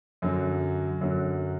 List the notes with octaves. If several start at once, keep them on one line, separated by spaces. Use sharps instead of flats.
F#2 D3 F#3
F#2 D3 F#3